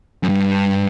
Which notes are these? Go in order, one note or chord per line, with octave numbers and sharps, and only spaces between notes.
F#2
G2